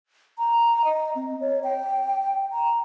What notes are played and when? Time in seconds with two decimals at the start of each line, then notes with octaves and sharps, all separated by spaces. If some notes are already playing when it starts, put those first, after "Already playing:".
0.38 A#5
0.84 D#5
1.16 C4
1.40 C#5
1.64 G5
2.52 A#5